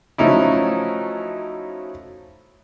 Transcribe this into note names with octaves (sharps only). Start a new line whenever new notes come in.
F3 F#3 A3 C#4 D#4 E4